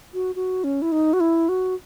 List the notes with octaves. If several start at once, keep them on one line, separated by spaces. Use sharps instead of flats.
F#4
F#4
C#4
E4
D#4
F#4
E4
F#4